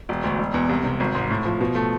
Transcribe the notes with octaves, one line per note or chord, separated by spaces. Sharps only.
E1
D2
E1
E2
C2
C3
G#1
G#2
A2
F3
B2
A3